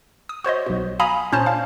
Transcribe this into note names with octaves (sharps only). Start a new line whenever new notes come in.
D#6
F#4 C5 C#5 D#5
B1 B2
F5 G#5 A#5 B5 D#6
A#2 C#4 C5 C#5 A5
D4 F5